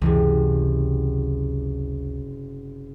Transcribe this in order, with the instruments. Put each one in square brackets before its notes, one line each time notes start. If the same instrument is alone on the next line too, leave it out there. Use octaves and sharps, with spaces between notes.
[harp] F#1 C3 [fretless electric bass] C#2 E3